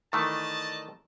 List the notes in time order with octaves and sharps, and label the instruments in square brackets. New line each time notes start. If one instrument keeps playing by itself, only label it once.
[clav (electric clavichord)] D#3 E3 A3 [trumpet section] D5 D#5 A5